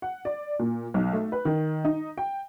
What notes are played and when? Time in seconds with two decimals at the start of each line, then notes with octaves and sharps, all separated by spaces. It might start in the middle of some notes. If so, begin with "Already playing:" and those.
0.02 F#5
0.25 D5
0.59 A#2
0.94 B1
1.13 A3
1.32 B4
1.45 D#3
1.85 D#4
2.18 G5